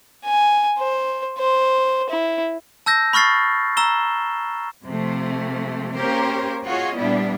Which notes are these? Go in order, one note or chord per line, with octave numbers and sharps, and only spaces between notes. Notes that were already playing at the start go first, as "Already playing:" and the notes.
G#5
C5
C5
E4
A5 E6 G6 A#6
B5 C#6 F6 A6 C7
A#5 E6 E7 G7
C3 F3 A3
A#3 C#4 G4 A#4 C5 C#5
F4 F#4 G#4 C#5 D#5
A#2 G3 B3 D4 E4